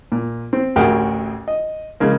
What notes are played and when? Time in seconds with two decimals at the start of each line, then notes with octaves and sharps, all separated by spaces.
0.12 A#2
0.53 C4
0.76 A1 D2 F#4 G#4 A#4 G5
1.48 D#5
2.00 C#3 G#3 A#3